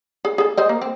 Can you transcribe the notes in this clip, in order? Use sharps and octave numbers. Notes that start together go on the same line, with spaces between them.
G#4
G#4 A4
G#4 C5 D#5
A#3
C4